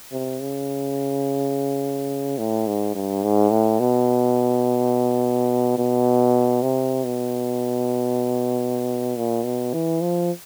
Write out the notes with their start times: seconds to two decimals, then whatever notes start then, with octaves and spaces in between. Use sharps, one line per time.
0.12 C3
0.40 C#3
2.39 A2
2.67 G#2
2.95 G2
3.23 G#2
3.51 A2
3.80 B2
5.78 B2
6.63 C3
7.04 B2
9.17 A#2
9.45 B2
9.73 E3
10.02 F3